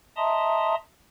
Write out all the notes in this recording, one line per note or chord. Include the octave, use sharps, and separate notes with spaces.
D#5 E5 A5 A#5 C6 D#6